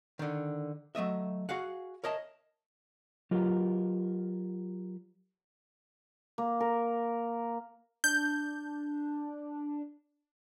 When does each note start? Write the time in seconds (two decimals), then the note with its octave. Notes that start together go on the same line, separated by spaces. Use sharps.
0.19 D3 D#3
0.95 F#3 A3 D#5 E5
1.49 F#4 G#4 F5 F#5
2.04 A#4 C#5 D#5 E5 A5
3.31 F#3 F4 G4 A#4 B4 D#5
6.38 A#3
6.60 A#4
8.04 D4 G6